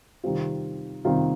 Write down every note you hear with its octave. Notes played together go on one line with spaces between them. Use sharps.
C3 D#3 G3 C4 F4
C3 D#3 G3 C4 F4